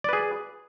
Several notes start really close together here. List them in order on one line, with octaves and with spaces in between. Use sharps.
D5 B4 G#4